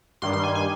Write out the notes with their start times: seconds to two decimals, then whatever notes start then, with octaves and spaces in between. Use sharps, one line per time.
0.22 G2 D#3 G3 C6
0.33 C6
0.43 G#5
0.55 G#5